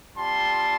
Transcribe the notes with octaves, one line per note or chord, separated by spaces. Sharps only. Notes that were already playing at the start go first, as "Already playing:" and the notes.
G3 C4 F4 A5 C6